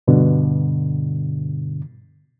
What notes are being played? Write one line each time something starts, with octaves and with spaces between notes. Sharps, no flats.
G2 B2 D3